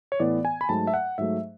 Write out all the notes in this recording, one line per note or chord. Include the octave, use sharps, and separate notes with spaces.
C#5
A2 E3 B3 D5
G#5
B5
G#2 F#3 A3 A5
E5
F#5
G#2 F#3 A3 E5